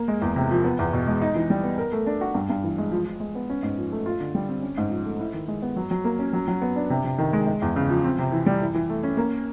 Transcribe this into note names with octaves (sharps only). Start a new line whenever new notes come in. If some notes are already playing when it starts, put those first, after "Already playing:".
Already playing: A#3
G#3
E2
C3
F3
B3
E2
B2
G#3
D#4
E3
G3
B3
A#4
A3
D4
F#4
G2
G2
E3
G#3
F3
F3
G#3
B3
C#4
G#2
F3
A3
F4
D3
G3
C4
C#4
G#2
F3
A3
E4
D#3
G#3
B3
F#3
F#3
A#3
C#4
F#3
F#3
B3
D4
C3
C3
D#3
G#3
G#3
E2
C#3
F3
C4
C3
E3
G3
E3
E3
A3
C#4
A#3